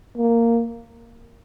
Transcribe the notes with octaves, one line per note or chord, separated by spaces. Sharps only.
A#3